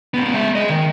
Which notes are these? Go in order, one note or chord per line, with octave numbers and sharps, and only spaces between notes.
A2 B3
G#3 E5
G#4 D#5
D#3